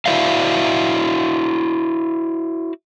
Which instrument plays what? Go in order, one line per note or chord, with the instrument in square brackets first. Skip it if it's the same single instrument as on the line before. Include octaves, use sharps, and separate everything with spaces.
[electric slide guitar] E4 F#4 C5 D5 E5 F5